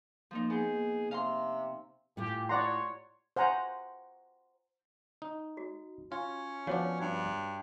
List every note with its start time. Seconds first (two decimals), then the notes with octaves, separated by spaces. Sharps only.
0.31 F3 A#3 D#4
0.50 B3 G#4 G6
1.11 C3 F5 A#5 C6
2.17 A2 F4 G4 G#5
2.49 C#5 D5 F#5 A#5 C6
3.36 C5 F#5 G#5 A#5
5.22 D#4
5.57 F#4
6.12 C#4 F4
6.67 F3 B3 D4 F#4 C#5
7.00 G2